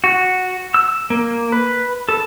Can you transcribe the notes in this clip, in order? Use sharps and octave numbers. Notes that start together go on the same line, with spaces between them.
F#4
E6
A#3
B4
A4